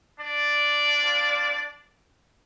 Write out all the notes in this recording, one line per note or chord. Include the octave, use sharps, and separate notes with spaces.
D4 D5
C4 F4